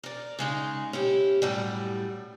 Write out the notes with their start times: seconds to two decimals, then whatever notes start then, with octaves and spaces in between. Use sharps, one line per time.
0.03 A#4 D5
0.39 C#3 G#3 D#4
0.93 C#4 E4 G4
1.42 F#2 A2 G3